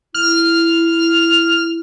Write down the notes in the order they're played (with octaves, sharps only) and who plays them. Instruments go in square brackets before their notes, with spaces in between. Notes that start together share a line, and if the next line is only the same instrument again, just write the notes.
[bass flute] E4 [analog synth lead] F6